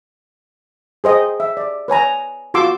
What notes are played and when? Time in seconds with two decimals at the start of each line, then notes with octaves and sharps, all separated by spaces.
1.04 G#4 C5 D#5 G5
1.40 E5
1.57 D5
1.88 B4 C#5 G#5 A#5
2.54 F4 F#4 C6 D6 E6